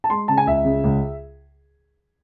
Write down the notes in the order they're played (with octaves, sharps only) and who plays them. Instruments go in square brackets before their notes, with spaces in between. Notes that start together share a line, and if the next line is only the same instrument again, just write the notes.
[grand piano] A5
G#3 C6
C#3 A5
G#5
C#2 E5
C#3
C#2